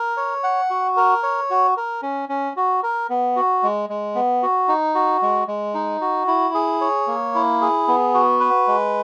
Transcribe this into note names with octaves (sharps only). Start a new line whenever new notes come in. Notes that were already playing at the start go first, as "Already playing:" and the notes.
Already playing: A#4
C#5
F#5
F#4
A#4
C#5
F#4
A#4
C#4
C#4
F#4
A#4
B3
F#4
G#3
G#3
B3
F#4
D#4
F#4
G#3
G#3
D#4
F#4
E4
G#4
C#5
A#3
E4
G#4
B3
F#4
B4
G#3